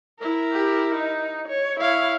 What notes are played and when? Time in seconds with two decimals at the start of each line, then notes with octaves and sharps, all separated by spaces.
0.20 E4 A#4
0.52 G4
0.95 D#4
1.49 C#5
1.80 E4 C#5 F5